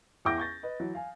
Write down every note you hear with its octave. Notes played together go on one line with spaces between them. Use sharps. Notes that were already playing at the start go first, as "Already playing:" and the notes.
E2 E5 G5 D6 G6 A#6
C#6 G6 A6 A#6
B4 D#5
E3 F#3
F5 G#5